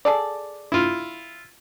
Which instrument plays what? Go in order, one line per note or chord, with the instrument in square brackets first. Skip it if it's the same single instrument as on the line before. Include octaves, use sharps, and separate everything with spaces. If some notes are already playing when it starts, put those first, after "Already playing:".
[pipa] G#4 A4 D5
[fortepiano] E4 F4